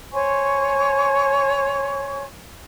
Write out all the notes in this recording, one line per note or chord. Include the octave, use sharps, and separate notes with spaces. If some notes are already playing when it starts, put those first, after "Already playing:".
C5 C#5 G#5 C#6